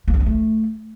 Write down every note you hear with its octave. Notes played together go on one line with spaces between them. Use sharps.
A#3
D4
B3
A3